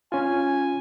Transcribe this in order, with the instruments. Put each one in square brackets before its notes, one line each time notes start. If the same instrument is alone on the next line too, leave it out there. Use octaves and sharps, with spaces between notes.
[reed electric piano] C#4 F4 [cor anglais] G#5